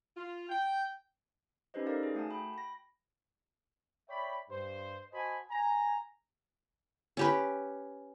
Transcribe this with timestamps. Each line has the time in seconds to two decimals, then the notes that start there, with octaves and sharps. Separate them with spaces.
0.16 F4
0.50 G5
1.74 C#4 D#4 G4 B4 C5 D#5
1.86 D#4 A4 A#4 C5 D5 F5
2.03 G#4
2.15 A3 F#4 F#5 G#5 A5
2.30 G5 B5
2.54 B5 A#6
4.08 C#5 D5 E5 G5 B5
4.49 G2 C5
5.12 F#4 C5 D#5 G#5 A5 B5
5.49 G#5 A#5
7.17 C#4 G4 B4